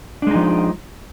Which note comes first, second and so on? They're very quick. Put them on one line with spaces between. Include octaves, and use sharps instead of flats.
D4 G#3 D#4 F3